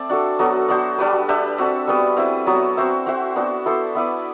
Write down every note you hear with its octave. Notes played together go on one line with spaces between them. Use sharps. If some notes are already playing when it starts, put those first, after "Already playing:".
Already playing: A3 C4 D5
D4 F#4 A4
F#3 B3 F#4 A4
B3 D4 F#4 C5
G3 D4 F#4 B4
D4 G4 B4 E5
C4 F#4 A4
G3 B3 F#4 B4
C4 E4 B4
F#3 B3 F#4
C4 F#4 C5 E5
C4 F#4 C5 E5
B3 D4 F#4
B3 E4 A4 C5
B3 E4 B4 D5